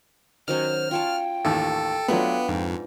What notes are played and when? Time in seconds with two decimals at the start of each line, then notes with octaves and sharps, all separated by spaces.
0.48 D#3 F#3 C#4 C5 F6
0.91 F4 C#5 G5 A5
1.45 A1 D#2 A4 E6
2.08 F#3 A3 B3 D4 F4 B4
2.48 F2 G#2